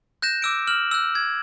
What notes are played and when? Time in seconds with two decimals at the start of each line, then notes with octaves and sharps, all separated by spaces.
0.22 F#6 G6 A#6 E7
0.42 D6 E6 D7
0.67 F6 E7 F#7
0.91 E6 F#6
1.15 G#6